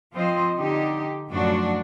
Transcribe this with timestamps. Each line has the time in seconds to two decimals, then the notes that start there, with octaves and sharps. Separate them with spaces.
0.13 F3 C4 F4 C5 D#5
0.56 D3 D#4 G4
1.30 F#2 A2 F3 F#3 D4 F#4